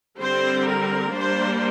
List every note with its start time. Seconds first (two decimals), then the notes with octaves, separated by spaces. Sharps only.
0.19 D3 G3 C4 C5
0.65 A#4
1.12 G3 A#3 D4 C5